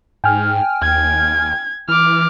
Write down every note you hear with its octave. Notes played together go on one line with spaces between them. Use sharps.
G#2 G5 G#5 F6
D#2 G#6
E3 D6 F6